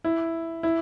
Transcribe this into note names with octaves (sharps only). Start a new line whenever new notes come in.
E4
E4